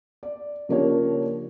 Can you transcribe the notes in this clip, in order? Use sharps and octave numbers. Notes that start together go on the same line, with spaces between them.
D5
C#3 F3 A#3 D4 G4 C#5